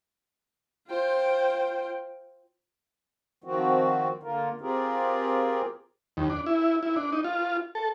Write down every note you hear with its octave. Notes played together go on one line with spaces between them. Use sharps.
F4 C5 G5
D#3 F3 C4 F#4
D3 A#3 F4 A#4
C4 F4 G4 G#4 A#4
D#2
D4
E4
E4
D4
D#4
F4
A4